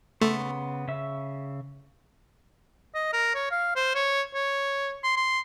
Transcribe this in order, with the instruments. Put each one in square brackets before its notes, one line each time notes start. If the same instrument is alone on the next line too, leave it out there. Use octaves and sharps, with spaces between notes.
[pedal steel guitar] C#3 B3 C6 [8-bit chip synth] A3
[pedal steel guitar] C#3 E5
[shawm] D#5
A#4
C#5
F5
C5
C#5
C#5
C6
C6